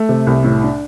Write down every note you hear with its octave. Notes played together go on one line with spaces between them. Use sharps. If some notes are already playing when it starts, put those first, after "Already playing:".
Already playing: A3
C3
C2
A2
D4